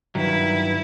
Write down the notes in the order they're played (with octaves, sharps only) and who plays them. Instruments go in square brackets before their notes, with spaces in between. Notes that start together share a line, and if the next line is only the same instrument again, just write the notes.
[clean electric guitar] G2 D#3 F#3 [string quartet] E4 B4